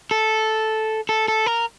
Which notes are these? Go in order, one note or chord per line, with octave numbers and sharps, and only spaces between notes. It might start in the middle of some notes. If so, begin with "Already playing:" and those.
A4
A4
A4
A#4